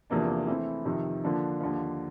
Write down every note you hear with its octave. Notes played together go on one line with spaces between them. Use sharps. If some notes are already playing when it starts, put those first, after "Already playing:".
E2 C3 F3 A#3 D4
E3 A3 C4 E4
F2 C3 D#3
D3 F3 A#3 D4
D#2 D3 F3